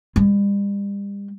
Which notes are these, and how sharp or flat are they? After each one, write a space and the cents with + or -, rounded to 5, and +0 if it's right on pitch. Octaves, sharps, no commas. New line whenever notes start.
G3 +40